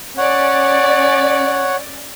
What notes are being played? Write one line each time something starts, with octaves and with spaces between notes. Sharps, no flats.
C#4 C#5 D5 F#5